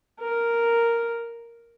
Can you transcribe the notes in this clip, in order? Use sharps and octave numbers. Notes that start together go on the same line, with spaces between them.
A#4